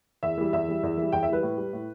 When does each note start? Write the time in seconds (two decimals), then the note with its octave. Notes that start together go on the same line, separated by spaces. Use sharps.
0.23 E2 E5
0.37 E3 G3
0.53 E2 E5
0.68 E3 G3
0.83 E2
0.97 E3 G3
1.12 E2 G5
1.23 E5
1.28 E3 G3 B4
1.43 A2
1.58 G3
1.73 A2